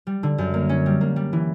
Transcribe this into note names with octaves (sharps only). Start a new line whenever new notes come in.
G3
D3
F#2
A#3
C#4
G3
A#3
G3
E3